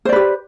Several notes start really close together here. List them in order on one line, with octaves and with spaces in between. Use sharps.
C5 D5 B4 G4